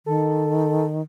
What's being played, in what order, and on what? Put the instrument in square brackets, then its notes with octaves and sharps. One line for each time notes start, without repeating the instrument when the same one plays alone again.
[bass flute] D#3 [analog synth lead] A4